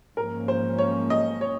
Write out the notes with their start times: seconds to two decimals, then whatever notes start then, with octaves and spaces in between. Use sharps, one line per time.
0.16 G#2 F3 A#3 C#4 A#4
0.48 C5
0.78 C#5
1.10 D#5
1.41 C#5